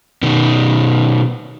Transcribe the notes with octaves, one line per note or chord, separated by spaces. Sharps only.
B2 D#3